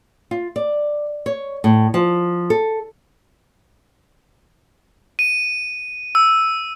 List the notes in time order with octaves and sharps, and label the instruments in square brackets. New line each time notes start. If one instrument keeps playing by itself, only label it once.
[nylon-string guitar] F4
D5
C#5
A2
F3
A4
[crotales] D#7
E6